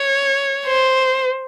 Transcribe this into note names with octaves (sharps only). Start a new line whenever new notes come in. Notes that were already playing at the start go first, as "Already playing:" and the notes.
Already playing: C#5
C5